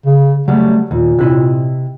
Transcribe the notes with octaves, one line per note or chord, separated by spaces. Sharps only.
C#3
C#3 F#3 G3 A3
D#2 A#2
C3 E4 D#5